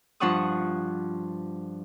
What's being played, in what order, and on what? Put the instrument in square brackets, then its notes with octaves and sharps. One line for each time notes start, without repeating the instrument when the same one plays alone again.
[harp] G2 F3 D4 F#5 C#6 D#6